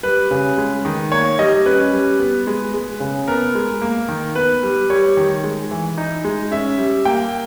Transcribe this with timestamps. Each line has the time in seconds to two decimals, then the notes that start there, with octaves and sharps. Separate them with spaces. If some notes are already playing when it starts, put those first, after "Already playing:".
0.03 G3 B4
0.31 C#3
0.58 G#3
0.85 D#3
1.12 A#3 C#5
1.39 G3 D#5
1.66 C#4 B4
1.93 G3
2.20 B3
2.47 G#3
2.74 G#3
3.00 C#3
3.28 B3 A#4
3.55 G#3
3.82 A#3
4.09 D#3
4.35 B3 B4
4.63 G3
4.90 G3 C#5
5.17 D#3
5.44 G#3
5.71 E3
5.98 D#4
6.24 G#3
6.51 C#4 E5
6.78 G3
7.05 A#3 G5